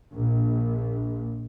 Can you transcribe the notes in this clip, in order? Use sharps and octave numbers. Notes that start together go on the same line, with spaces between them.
A#1